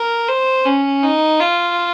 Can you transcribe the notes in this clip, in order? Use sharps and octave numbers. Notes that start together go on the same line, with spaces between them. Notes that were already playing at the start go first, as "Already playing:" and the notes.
Already playing: A#4
C5
C#4
D#4
F4